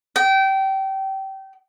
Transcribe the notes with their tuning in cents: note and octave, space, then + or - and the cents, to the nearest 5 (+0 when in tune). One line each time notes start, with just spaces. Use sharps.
G5 -25